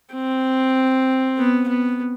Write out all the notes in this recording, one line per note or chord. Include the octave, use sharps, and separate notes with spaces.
C4
B3
B3